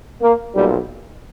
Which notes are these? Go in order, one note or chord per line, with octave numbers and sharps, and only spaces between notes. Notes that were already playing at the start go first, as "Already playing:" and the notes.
A#3
B1 A#2 G3